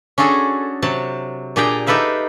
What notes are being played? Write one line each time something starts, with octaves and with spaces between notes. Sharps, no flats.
C#4 D4 F#4 G#4 A4
C3 F#3 A5
A#2 D4 G4 G#4 G5 A#5
D#4 G4 A4 B4 E5 F5